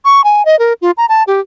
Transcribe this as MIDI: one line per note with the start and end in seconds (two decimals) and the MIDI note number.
0.05 0.24 85
0.24 0.45 80
0.45 0.58 75
0.59 0.73 70
0.82 0.91 65
0.97 1.06 82
1.09 1.23 81
1.27 1.40 67